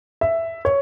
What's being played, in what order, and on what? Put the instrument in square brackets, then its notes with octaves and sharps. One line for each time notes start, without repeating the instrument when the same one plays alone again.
[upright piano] E5
C#5